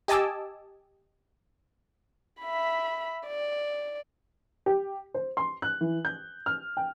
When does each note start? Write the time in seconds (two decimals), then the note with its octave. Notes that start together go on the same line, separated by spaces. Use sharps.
0.08 G4 D#5 G#5 A5 D6 E6
2.42 E5 B5
3.27 D5
4.66 G4
5.14 C5
5.37 C6
5.62 F#6
5.81 E3
6.05 G6
6.46 F6
6.77 G5